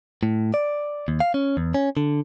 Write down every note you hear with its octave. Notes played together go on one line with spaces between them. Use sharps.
A2
D5
D#2
F5
C#4
E2
C#4
D3